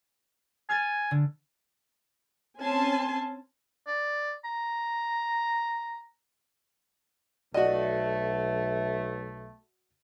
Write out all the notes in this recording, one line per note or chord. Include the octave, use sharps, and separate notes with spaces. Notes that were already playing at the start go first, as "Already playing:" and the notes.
G#5 F6 G#6 A6
D3
C4 C#4 G#5 A5 C6
D5
A#5
B1 A3 F#4 D5 D#5